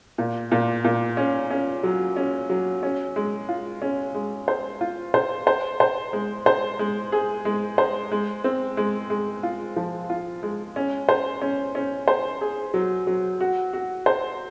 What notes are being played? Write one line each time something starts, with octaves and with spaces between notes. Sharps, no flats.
A#2
A#2
A#2
C#4
C#4
F#3
C#4
F#3
C#4
G#3
F4
C#4
G#3
C5
F4
C5
C5
C5
G#3
C5
G#3
G#4
G#3
C5
G#3
C4
G#3
G#3
F4
F3
F4
G#3
C#4
C5
C#4
C#4
C5
G#4
F#3
F#3
F#4
F#4
C5